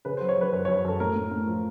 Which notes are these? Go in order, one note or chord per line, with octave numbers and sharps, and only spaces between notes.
C#3 B4
C5
F#3
C#5
F#3 B4
F#2 B4
C#5
F#2
F#2 A4
A2 A#4
A2
A2
F3